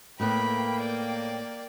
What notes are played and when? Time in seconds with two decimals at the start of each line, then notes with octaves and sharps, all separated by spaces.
0.20 A2 A#3 B3 B4 G5 B5
0.81 D5